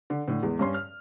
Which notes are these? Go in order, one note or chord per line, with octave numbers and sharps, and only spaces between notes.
D3
A2 D3
E2 G#3
G2 C#4 C6
F6